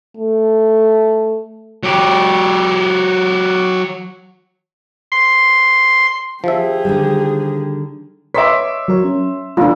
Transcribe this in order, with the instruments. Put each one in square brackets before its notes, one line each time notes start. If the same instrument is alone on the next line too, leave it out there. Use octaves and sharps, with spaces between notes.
[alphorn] A3
[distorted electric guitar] F#3 G4
[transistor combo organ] C6
[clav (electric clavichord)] F3 E5 [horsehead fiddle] G4 G#4
[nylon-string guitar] D3 D#3 G3
[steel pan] B4 [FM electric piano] C#5 D#5 D6 [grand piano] E5 C6 B6
[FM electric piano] F#3 A#4 C#5
C#4
[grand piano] F1 [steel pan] D4 F4